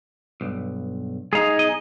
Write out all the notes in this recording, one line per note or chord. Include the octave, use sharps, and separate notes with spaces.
B1 G2
G#3 D#4 G#4 F5
B1 D#5